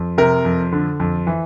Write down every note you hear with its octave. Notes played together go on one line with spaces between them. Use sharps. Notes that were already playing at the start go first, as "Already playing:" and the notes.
Already playing: F2
C3 A#4
F2
D3
F2
E3